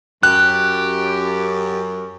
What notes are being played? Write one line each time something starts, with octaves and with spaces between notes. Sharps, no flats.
F#2 G4 F#6